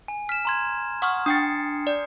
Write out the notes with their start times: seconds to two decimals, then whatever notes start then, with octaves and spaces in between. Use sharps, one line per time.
0.08 G#5
0.29 F6 B6 E7
0.45 A#5 C6 G#6
1.02 F#5 C#6 D#6 F6
1.26 D4 G5 D#6 A6 C7 C#7
1.87 D5